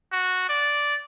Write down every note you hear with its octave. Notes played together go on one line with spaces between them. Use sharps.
F#4
D5